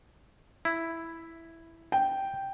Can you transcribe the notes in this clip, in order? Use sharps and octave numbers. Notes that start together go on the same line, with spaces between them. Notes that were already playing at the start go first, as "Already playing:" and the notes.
E4
G5